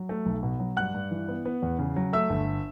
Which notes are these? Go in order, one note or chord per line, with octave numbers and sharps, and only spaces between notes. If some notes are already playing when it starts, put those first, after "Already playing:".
Already playing: F#3
A3
B1
B2
F#3
G2 F#5 F#6
G2
E3
B3
B3
E2
C#3
F#3
A3 E5 E6
G1